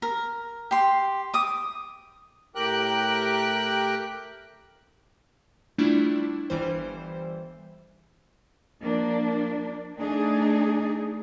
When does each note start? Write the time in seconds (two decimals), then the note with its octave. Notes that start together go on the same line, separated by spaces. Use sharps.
0.02 A#4
0.71 G4 C6
1.34 D6 D#6
2.55 A2 G4 A#4 G5 F#6
5.78 G3 A3 D4 E4 F4
6.50 G1 E3 G3 C5
8.83 F3 A#3 D4
9.99 A3 D4 D#4 G#4